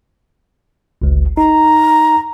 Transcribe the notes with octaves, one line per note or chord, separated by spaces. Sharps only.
G1 C#2
D#4 A#5